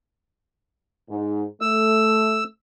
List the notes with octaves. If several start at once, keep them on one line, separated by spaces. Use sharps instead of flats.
G#2
A3 E6